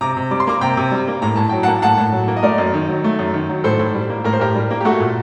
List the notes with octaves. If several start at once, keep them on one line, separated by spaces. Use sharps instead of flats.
C3 A#5 D6
C3
G3 D6
C6
A#3 A#5 D6
C3 G5 A#5
C3
G3
A#3
A2 A#5
A2 A5
F#3 G5
F#5 A5
A#3
A2 F#5 A5
A2
F#3
A#3
D#5
A3 A#4 D5
F#2
D#3
F#3
A3
F#2
D#3
F#3
A2 A4 C5
A2
G3
A#3
A2 A#4
C5
A2 G4 A#4
G3
A#3
G4
A3 F#4 A4
A#2